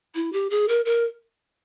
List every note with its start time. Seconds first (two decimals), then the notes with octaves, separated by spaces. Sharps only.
0.15 E4
0.33 G4
0.50 G#4
0.68 A#4
0.85 A#4